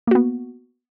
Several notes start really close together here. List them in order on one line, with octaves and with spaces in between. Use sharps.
A#3 F#4 B3